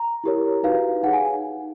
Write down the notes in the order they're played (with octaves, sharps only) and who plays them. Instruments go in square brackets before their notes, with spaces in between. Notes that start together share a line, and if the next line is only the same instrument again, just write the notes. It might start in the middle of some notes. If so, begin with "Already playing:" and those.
Already playing: [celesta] A#5
E4 G4 A#4 C#5
D#4 F#4 B4 F5
D#4 G#4 C#5 F#5
G#5